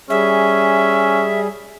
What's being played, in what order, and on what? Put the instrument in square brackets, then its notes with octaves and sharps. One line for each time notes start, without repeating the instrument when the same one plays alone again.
[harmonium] G3 G#4 [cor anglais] C#4 [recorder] E5